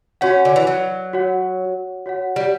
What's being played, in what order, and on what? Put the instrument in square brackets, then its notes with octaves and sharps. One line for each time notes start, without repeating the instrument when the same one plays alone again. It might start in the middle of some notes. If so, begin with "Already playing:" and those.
[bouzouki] C#4 [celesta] F#4 C#5 F#5
[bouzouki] D3
E3
F#3
[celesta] F#4 C#5 F#5
F#4 C#5 F#5
[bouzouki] G3